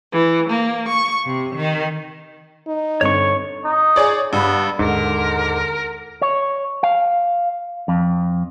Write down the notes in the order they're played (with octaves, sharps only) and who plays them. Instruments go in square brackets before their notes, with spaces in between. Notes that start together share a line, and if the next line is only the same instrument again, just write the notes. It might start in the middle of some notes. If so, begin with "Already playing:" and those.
[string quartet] E3
A#3
C#6
C3
D#3
[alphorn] D#4
[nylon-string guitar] G2 D3 C4 [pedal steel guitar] C#5 C#6
[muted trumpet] D#4
[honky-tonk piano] G#4 C#5 D5
[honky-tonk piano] G2 [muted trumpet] B3
[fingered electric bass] D#2 D4 [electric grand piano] G#2 [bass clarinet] D3 [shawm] A#4
[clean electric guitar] C#5
F5
F2